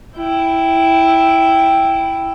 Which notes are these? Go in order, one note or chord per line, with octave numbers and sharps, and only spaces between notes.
E4 G5